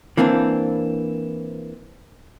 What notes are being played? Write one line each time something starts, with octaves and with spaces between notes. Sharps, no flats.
E3 A#3 C4 D4